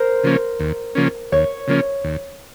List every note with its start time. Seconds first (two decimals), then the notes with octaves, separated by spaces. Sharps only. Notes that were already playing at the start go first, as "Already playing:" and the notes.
Already playing: A#4 C5
0.23 C#3 F3 A#3 C#4
0.60 D#2
0.95 C#3 F3 A#3 C#4
1.32 D#2 C#5
1.68 C#3 F3 A#3 C#4
2.04 D#2